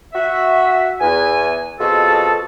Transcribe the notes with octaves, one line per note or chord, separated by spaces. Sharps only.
F#4 E5
E2 G#5
F2 B2 F4 F#4 G#4 A4